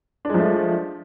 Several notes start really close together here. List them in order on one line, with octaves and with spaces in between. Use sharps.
D4 G#3 F3 A3